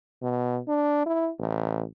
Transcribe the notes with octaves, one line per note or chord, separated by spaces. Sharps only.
B2
D4
E4
A1